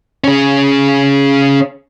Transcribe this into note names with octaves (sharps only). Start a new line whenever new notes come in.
C#4 G#4